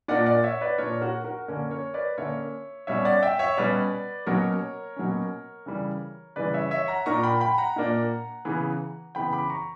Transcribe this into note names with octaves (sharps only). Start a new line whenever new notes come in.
A#2 A#3 D4 D5 F#5
D5 F#5
C#5 E5
B4 D5
A#2 A#3 D4 A#4 C#5
F#4 A#4
F#4 A#4
D3 A#3 C#4
A#4 C#5
B4 D5
D3 A#3 C#4 C#5 E5
B2 G3 C#4 C#5 E5
D5 F#5
E5 G5
C#5 E5
B2 G3 C#4 B4 D5
B2 F#3 A#3 C#4 A#4 C#5
B2 F#3 A#3 C#4
C#3 E3 G3
C#3 E3 G3 B4 D5
C#5 E5
C#5 E5
F#5 A#5
A#2 A#3 D4 A#5 C#6
G5 B5
G5 B5
F#5 A#5
A#2 A#3 D4
C#3 E3 B3
C#3 E3 B3 G5 B5
B5 D6
A#5 C#6